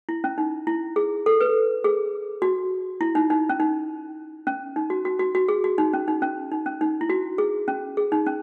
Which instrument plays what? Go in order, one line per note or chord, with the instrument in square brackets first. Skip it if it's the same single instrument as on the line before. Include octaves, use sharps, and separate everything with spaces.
[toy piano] E4
C#4
D#4
E4
G#4
A4
B4
G#4
F#4
E4
D#4
D#4
C#4
D#4
C#4
D#4
F#4
F#4
F#4
F#4
G#4
F#4
D#4
C#4
D#4
C#4
D#4
C#4
D#4
E4
F#4
G#4
C#4
G#4
D#4
C#4